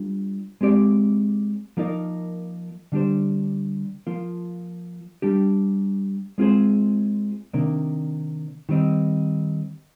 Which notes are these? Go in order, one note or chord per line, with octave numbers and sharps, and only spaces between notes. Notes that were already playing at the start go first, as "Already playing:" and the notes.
Already playing: G3 D4 F4
G#3 C4 G4 D5
F3 A#3 D#4 A#4 D5
D3 G3 D4 G4 C5
F3 A#3 F4
G3 D4 G4
G#3 C4 F4 G#4 C5
C3 D#3 A#3 D4
D#3 G3 C4 D#4